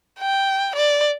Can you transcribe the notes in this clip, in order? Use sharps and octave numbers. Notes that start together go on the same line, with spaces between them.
G5
D5